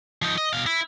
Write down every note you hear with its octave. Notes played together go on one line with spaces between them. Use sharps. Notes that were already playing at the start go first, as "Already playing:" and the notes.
F3 D#4
D#5
B2 F5
E4